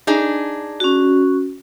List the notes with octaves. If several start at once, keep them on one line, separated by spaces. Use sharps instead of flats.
D4 D#4 G#4
C#4 F#4